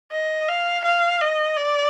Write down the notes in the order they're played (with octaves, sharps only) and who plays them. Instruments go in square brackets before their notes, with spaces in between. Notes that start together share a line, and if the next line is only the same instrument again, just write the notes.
[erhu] D#5
F5
F5
D#5
D5